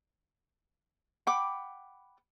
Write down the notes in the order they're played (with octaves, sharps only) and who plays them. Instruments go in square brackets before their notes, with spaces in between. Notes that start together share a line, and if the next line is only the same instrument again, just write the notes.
[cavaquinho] F#5 G5 B5 D6